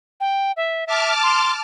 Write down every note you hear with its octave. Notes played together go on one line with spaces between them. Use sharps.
G5
E5
E5 A5 D6 F6
C6